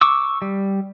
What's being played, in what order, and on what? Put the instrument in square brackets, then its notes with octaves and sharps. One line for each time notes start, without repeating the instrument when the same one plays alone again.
[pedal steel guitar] C#6 D6 E6
G3